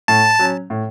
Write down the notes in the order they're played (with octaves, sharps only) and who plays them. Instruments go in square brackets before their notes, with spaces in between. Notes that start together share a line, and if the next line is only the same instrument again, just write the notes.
[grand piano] A2 [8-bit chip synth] A5
[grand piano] F#3 C#4
A2